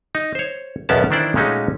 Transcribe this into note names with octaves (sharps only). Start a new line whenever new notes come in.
D#4
C5 C#5
B1 E2 B3 C#4 A#4 A5
D#3 E3 D4 E4 C5 D5
A#2 G#3 A3 C#4 D#4 F#4